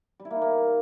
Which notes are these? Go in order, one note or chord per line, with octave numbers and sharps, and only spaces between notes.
G3
E4
A#3
D#4
A#3